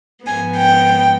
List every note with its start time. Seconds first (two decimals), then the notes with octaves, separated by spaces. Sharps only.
0.26 G#2 F3 G#3 B3 G#5
0.57 G5